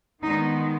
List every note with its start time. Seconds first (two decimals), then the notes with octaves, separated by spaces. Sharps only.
0.23 D#3 G#3 B3 D#4